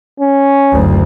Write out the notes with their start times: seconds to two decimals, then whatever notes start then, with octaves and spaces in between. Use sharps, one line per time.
0.20 C#4
0.72 F#1 D2